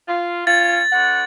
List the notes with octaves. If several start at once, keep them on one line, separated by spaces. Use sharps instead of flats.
F4
C#4 F4 A6
D2 F#5